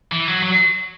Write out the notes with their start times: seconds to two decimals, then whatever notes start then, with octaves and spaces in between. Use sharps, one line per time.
0.12 E3
0.27 F#3
0.43 F#3